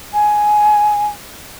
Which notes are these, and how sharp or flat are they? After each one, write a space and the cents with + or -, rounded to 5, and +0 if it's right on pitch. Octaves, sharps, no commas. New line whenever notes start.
G#5 +10